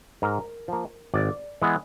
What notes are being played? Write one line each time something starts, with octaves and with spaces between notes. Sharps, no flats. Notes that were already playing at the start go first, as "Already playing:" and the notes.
G#2 A#4
F3 A#3
G#1 D5
E3 G#3 B3